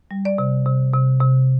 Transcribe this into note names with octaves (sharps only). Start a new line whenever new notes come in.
G3
D5
C3
C3
C3
C3